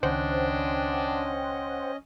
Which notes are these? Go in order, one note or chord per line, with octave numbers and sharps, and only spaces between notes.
C#2 D#3 C#4 D4 C5 D#5 F#5 G5